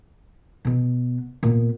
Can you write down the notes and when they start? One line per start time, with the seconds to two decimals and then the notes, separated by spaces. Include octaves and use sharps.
0.65 B2 B3
1.43 A#2 B3